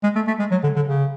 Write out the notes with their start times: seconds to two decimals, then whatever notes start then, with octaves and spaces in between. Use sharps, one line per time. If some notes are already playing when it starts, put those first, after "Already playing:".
0.04 G#3
0.15 A3
0.28 A3
0.39 G#3
0.51 F#3
0.64 D3
0.76 D3
0.87 C#3